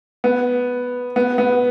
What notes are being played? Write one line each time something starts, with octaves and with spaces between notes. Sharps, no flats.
B3
B3
B3